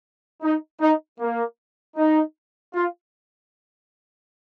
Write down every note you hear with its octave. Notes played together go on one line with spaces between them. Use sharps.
D#4
D#4
A#3
D#4
F4